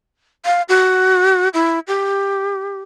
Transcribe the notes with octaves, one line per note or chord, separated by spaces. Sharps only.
F5
F#4
E4
G4